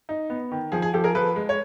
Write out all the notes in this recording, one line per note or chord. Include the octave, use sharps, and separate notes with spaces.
D#4
B3
D#3
F3 G#4
G#4
F3 G4 A4
G#4 A#4
F3 A4 B4
G#3
C#5